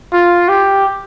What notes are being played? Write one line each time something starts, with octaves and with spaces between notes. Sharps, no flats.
F4
G4